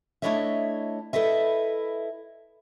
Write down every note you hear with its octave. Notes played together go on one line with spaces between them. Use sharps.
A3 D4 E4 C#5 D#5 E5
E4 A4 B4 D#5 E5